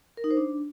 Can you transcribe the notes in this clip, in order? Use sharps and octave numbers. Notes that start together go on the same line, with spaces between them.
A#4
D#4
C5
D4